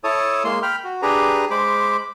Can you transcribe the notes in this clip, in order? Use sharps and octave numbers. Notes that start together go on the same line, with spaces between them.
E4 A4 C#5 A5 D#6
G#3 A#3 C6
G5 B5 F6
F#4
D4 G4 G#4 B4 A#5
G#3 C5 B5 D6